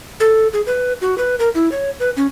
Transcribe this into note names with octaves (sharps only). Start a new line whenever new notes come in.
A4
G#4
B4
F#4
B4
A#4
E4
C#5
B4
C#4